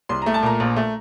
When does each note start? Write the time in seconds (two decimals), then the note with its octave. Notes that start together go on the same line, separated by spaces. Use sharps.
0.09 C2 C6
0.22 A3 A#5
0.34 A5
0.43 A#2 A#5
0.60 A#1
0.76 A3